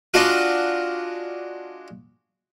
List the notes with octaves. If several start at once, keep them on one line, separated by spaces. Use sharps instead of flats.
G#3 D4 F4 F#4 F5